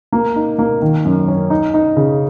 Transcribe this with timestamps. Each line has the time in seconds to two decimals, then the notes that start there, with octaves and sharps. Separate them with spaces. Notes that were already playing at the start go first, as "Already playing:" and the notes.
0.12 A#3
0.36 D#4
0.59 A#3
0.82 D#3
1.05 F#2
1.28 C#4
1.50 D#4
1.74 D#4
1.97 C#3